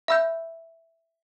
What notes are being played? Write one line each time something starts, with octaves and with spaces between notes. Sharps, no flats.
E5 B5 E6 G6